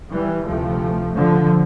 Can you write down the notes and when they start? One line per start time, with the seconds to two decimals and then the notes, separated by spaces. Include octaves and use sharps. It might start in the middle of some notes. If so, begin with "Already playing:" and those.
0.11 E3 G3
0.45 D2 C3 F3 A3
1.16 D3 F3